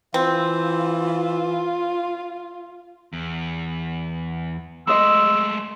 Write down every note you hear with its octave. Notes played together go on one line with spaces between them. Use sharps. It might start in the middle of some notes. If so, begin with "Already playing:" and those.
E3 C4 F4
E2
G#3 A3 D#5 C6 E6